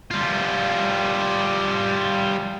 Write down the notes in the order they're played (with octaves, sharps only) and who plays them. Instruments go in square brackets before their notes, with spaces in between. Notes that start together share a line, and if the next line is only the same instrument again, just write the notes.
[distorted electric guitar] G3 F4